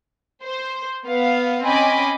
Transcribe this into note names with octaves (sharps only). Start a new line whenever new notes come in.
C5
B3 F5
C4 C#4 D#5 G#5 B5 D6